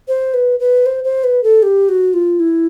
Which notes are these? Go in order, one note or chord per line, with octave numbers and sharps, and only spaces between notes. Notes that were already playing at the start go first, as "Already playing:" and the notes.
C5
B4
B4
C5
C5
B4
A4
G4
F#4
F4
E4